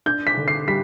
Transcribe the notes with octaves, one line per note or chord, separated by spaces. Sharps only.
D4 G6
B6
D3
C7
G3 B6